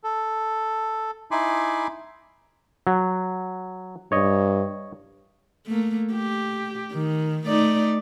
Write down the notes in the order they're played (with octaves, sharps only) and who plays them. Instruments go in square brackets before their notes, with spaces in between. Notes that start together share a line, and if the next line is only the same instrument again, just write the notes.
[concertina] A4
D#4 E4 G#5 B5 C6 D6
[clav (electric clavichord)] F#3
[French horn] G2 [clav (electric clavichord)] C#5 D#5
[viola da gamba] A3 A#3
G4
D#3
A3 D#4 D5